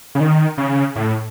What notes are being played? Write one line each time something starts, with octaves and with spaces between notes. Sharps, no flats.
C#3
D#3
C#3
A2